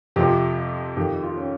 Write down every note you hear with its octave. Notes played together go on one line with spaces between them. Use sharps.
F2 C3 F3 G4
F2 D#3 G4
F4
C#4